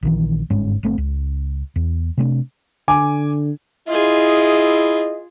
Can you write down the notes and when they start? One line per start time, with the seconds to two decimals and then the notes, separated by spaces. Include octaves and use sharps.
0.03 A#1 D#3 E3
0.50 G1 G#2 G#3 C#4
0.83 G1 A3 C4
0.98 C#2
1.76 E2
2.17 C3 A3 C4 D4
2.88 D3 G#5 D6
3.89 E4 F4 G#4 D#5